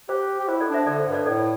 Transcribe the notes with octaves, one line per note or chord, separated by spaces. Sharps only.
G4 C5
G4
E4 C5
A4 D5
D4
C5 E5
D3 A4 D5
C5
G2
A4 D5
A2 A4 D5